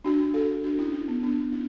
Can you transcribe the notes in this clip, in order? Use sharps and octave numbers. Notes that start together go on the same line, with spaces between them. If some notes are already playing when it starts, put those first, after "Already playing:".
D4 F#4
F#4 A4
D4 F#4
C#4 E4
C#4
B3
B3 D4
C#4 E4